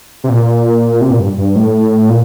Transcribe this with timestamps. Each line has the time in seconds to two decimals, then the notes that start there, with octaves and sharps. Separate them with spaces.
0.24 C3
0.29 A#2
1.01 C3
1.10 A#2
1.19 G2
1.38 G2
1.55 A2
2.09 A#2